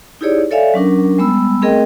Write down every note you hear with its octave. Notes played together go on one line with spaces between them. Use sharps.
D#4 E4 G4 G#4 C#5 D5
A4 C#5 D5 E5 F5 G#5
F#3 C#4 D4 A#4
G3 G#3 B3 B5 E6
A3 C4 G#4 A#4 D#5 G5